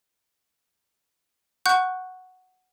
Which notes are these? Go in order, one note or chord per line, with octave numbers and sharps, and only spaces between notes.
F#5 C#6 F#6 G6